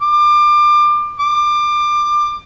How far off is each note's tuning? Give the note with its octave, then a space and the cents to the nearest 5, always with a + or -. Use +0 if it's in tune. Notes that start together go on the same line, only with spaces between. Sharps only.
D6 +30
D6 +25